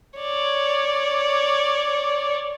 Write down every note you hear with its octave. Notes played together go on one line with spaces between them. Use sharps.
C#5 D5